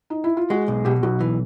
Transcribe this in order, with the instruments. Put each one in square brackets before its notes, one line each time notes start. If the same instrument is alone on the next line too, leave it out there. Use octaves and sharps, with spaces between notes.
[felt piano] D#4
E4
F4
[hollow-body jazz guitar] G#3 [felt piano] F#4
[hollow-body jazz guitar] B1
[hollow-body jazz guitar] B2 [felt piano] G4
[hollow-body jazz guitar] B1 [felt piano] F#4
[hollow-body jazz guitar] E3